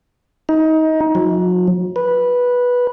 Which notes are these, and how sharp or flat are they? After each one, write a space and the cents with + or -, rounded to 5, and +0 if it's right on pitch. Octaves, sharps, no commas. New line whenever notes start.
D#4 +25
F#3 -40
B4 -10